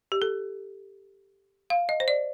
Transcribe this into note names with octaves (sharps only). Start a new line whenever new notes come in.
G4
A4
F5
D#5
C5
D5